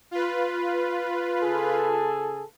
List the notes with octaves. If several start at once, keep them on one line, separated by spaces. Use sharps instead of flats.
F4 B4
C#3 G#4 A4